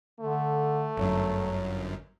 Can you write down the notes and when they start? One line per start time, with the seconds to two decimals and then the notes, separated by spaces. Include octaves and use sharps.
0.20 D3 A3
0.97 G1 F#2 F#3